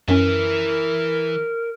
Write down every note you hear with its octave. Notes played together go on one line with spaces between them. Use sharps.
F#2 E3 C#4 A#4